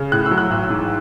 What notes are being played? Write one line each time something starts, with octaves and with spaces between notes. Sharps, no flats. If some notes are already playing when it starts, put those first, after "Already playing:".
Already playing: C#3
A2 F#6
E6
F#3
F#6
A1 E6
G#2